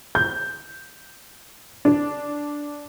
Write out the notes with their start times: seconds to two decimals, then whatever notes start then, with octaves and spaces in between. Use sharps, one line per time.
0.15 G6
1.85 D4